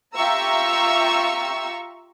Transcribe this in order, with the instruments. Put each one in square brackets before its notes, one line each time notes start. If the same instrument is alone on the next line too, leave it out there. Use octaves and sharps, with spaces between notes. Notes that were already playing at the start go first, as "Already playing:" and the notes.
[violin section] F4 G4 E5 A#5 C#6 E6